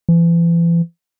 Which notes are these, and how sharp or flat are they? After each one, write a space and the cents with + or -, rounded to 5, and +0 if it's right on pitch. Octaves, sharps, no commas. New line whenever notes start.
E3 +40